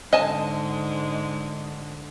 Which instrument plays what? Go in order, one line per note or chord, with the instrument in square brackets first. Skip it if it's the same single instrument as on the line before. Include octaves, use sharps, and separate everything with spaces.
[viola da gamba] G#2 D3 G#3 [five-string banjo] D#5 G#5 A5